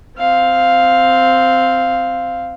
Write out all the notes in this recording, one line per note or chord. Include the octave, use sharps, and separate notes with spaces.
C4 F5